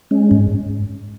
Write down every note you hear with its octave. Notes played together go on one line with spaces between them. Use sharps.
G#3 C#4
G#2